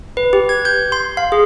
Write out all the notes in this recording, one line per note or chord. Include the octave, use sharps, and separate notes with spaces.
B4
G4
G#6
G6
C6
F5
G#4